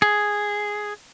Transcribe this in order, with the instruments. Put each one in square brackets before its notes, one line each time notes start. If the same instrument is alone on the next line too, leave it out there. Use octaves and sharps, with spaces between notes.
[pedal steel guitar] G#4